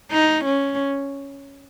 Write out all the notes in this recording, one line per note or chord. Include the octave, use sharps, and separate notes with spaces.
D#4
C#4